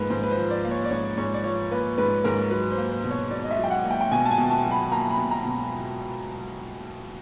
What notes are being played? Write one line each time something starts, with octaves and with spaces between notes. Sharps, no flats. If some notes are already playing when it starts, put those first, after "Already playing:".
Already playing: G#2 F3 A#3 A#4 B4
G#2 C5
B4
C5
F3
D5
A#3
C#5
D5
G#2 C#5
G#2 C#5
D5
F3 C#5
A#3 B4
G#2 B4
G#2 A#4
F#3 B4
C5
A#3
C5
B2
C#5
B2 D5
D#5
E5
F#3
G5
F#5
A#3
G5
G5
B2 G#5
A5
G#5
B2
A5
F#3
B5
A#3 A#5
B5
B2
A#5
B2